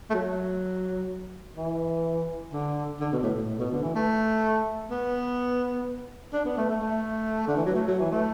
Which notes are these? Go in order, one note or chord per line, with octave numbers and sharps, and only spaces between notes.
A3
F#3
E3
D3
D3
B2
A2
A2
A2
B2
D3
E3
A3
B3
D4
B3
A3
A3
A3
D3
E3
F#3
A3
F#3
E3
A3